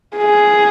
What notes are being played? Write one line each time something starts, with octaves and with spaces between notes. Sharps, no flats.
G#4